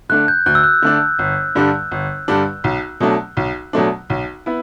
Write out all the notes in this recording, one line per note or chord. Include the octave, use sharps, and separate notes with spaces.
D3 A3 D4 F#6
G6
D2 F#6
E6
F#6
D3 A3 D4
G1
G2 D3 G3 D4
G1
G2 D3 G3 D4
B1
B2 F#3 A3 D4
B1
B2 F#3 A3 D4
B1
B3 E4